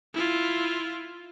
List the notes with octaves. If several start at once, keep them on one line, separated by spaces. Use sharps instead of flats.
E4 F4